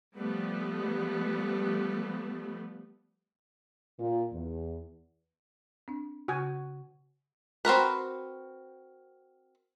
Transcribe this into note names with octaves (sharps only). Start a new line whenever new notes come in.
F3 G3 A3 B3
A#2
E2
C4 D4
C#3 F#4 G#5 G6
C4 F#4 A#4 B4